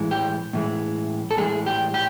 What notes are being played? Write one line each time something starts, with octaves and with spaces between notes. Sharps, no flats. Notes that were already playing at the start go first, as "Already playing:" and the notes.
Already playing: A2 E3 G#3
G4
A2 E3 G#3
A4
A2 E3 G#3 G#4
G4
G4